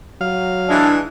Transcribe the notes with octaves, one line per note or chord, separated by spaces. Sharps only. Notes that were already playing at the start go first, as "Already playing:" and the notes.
F#3 F5
E3 G#3 D4 E4